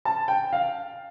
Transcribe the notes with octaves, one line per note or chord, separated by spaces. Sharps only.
A5
G5
F5